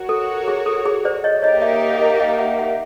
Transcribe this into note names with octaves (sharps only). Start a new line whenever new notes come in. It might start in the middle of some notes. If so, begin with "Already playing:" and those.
Already playing: F#4 A#4 C#5
A4
G#4
A4
G#4
C5 D5
C#5 D#5
A#3 D#4 G4 A#4 C#5 D#5
D5 E5
D#5 F5
D#5 F5
D#5 F5
E5 F#5
E5 F#5